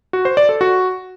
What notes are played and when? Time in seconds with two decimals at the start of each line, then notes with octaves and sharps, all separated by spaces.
0.13 F#4
0.25 C5
0.37 D5
0.49 A4
0.61 F#4